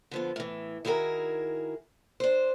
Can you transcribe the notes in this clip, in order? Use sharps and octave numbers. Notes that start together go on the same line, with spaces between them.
D3 F3 B3
A2 E3
D#3 E4 F#4 G#4 A#4
D4 C5